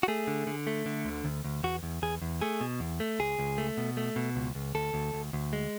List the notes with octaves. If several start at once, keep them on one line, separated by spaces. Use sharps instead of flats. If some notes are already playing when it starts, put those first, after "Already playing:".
F#4
A3 G#4
D3
D3
A3
D3
D2
D2
D2
E2 F#4
E2
E2 G#4
E2
A3 G#4
B2
E2
A3
C#2 G#4
C#2
A3
B2
A3
B2
C#2
C#2
D2 A4
D2
D2
D2
G#3